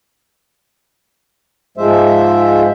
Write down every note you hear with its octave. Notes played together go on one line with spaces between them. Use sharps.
G#2 F3 G#3 C5 E5